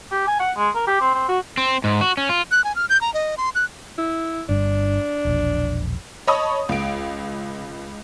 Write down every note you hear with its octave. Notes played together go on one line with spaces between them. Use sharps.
G4
G#5
F#5
G#3
A#4
G4
C4
C4
F#4
C4
G#2
F#4
C#4
F4
F#6
G#5
F6
G6
A#5
D#5
C6
F#6
E4
G1 G2 D4
E1 A#1
C#5 D#5 A5 B5 C#6 D#6
C#2 D7